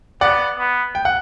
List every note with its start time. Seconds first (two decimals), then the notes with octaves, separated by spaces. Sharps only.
0.21 B3 D5 F#5
0.59 B3
0.95 G5
1.05 F#5